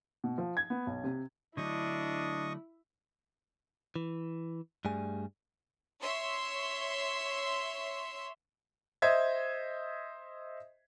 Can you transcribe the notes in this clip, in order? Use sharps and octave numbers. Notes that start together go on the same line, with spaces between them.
B2
F3
G#6
B3
B1
C3
D3 F#3 A3 D4 E4 D#5 C#6 D#6
E3
G2 G3 A3 G#4 G#5
C#5 E5 C6
C5 D#5 E5 G#6